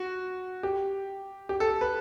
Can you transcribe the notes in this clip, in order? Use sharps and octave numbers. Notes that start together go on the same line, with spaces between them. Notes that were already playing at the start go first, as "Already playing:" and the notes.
Already playing: F#4
G4
G4
A4
B4